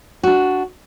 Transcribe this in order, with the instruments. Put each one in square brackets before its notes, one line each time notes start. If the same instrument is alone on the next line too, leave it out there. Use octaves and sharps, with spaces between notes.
[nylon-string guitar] D4 F#4